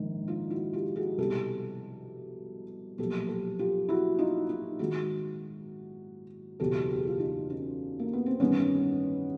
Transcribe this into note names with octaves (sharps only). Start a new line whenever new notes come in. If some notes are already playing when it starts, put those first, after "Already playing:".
Already playing: A#1 G#2 D#3
D#4 F4
E4 F#4
F4 G4
F#4 G#4
C2 B2 G4 A4
B1 A#2 F3 G4 A4
G4 A4
F4 G4
E4 F#4
D#4 F4
D#4 F4
G#1 G#2 D#3 F#4 G#4
F#1 E2 B2 G4 A4
G4
G#4
F4 G4
D#4 F4
C#4 D#4
A#3
B3
C4
A1 G2 D#3 B3 C#4